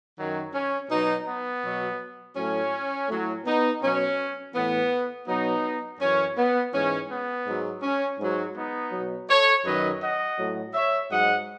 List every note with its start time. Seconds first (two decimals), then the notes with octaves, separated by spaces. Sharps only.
0.18 F#2 D#3 F#3
0.54 C#4
0.90 B2 F#3 B3 D#4
1.27 B3
1.63 B2 F#3
2.36 A2 F#3 C#4
3.09 A2 F#3
3.45 B3 D#4
3.82 B2 F#3 C#4
4.55 A2 E3 B3
5.27 B2 F#3 B3 D#4
6.00 F#2 E3 C#4
6.37 B3
6.73 G#2 E3 C#4
7.10 B3
7.46 G#2 F#3
7.82 C#4
8.20 G#2 F#3
8.55 B3 D#4
8.92 F#3
8.97 B2
9.29 A4 C#5
9.65 F#2 D#3 F#3 B4 D#5
10.02 D#5 F#5
10.38 A2 F#3
10.74 C#5 E5
11.10 G#2 F#3 D#5 F#5